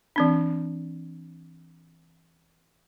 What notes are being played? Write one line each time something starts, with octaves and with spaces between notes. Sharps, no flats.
E3 C4 D4